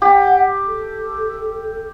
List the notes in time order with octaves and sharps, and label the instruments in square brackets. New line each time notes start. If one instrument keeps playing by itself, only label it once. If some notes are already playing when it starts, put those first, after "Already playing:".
[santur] G4 [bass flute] F#5
[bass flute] A4